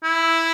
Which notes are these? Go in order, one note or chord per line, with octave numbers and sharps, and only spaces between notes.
E4